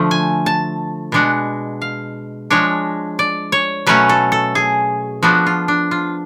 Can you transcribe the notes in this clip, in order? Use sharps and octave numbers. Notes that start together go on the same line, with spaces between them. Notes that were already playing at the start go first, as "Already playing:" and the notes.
Already playing: D3 F3 A3
G#5
A5
B2 G#3 D4 F#5
F5
F3 G#3 D4 C#5
D5
C#5
B2 F#3 A3 C#4 B4
A4
A4
G#4
F3 B3 D4 F#4
F4
D4
F4